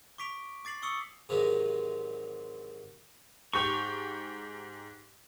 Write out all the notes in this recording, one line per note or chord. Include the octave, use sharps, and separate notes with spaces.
C#6 D6 B6 D7 F7
D6 A6 C7 F#7
C#6 D#6 E6 C#7 G7
G#2 C3 D#3 E3 F#3 G#3
G#2 G4 C#6 F7